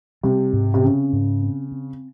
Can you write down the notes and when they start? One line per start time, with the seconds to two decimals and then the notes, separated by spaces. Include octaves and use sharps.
0.23 C3 G3
0.53 G#2
0.74 C3
0.82 C#3 C4
1.13 G#2
1.42 C4
1.72 C4